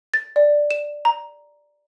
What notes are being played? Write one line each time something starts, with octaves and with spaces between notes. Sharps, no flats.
A6
D5
E7
A#5